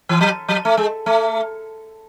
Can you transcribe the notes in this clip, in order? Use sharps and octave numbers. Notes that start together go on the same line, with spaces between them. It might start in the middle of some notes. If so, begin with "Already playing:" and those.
E3
F#3
F#3
A3
G#3
A3